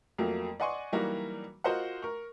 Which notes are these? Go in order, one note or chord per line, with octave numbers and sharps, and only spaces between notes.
F2 F#3 A3 A#3
D5 D#5 F#5 G#5 C6 C#6
E3 F#3 G3 A#3 D#4 F#4
F4 F#4 A#4 C5 D#5 F#5
A#4 C#6